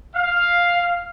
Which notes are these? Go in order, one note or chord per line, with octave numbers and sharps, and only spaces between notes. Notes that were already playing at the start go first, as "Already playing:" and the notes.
F5